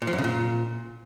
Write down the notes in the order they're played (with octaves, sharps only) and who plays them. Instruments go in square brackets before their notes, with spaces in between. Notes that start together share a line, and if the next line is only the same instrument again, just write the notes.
[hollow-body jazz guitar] A#2
F3
F#2
C#3
A#2